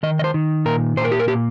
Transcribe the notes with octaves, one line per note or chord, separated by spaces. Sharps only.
D#3 D#5
D#5
C5
D#3
A#2 A#4
A#2 C5
A#4
G4
A#4
A#3 G4